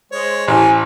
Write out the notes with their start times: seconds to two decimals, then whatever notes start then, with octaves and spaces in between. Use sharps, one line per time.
0.12 G#3 C5 C#5
0.48 A1 A#4 G#5